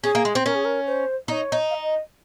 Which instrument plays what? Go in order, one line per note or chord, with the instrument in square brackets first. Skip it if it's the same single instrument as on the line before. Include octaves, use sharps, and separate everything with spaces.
[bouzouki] C#4 [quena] G#4
[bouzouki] A#3
G#3
C4
[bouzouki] C#4 [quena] A#4
[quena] G#4
A#4
C5
[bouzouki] D#4 [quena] C#5 D#5
[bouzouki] D#4
[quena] F5
D#5